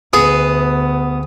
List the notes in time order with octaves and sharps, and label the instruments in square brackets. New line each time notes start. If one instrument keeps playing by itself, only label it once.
[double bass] D2 [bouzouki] B3 [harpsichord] G#4